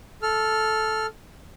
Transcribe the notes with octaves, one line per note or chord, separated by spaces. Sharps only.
A4 F6